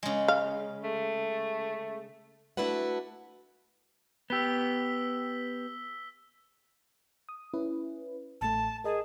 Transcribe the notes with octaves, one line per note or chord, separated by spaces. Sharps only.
C#3 G#3
F5
A3
A3 D4 E4 F#4 B4 F#5
B3 G4 E6 B6 G7
D#6
C#4 E4 B4
A1 A2 A3 A5
G#4 A#4 D#5 A5